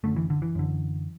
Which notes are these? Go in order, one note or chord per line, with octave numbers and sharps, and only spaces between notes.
F#2 D3 A3
E3
D3
E3
F#2 D3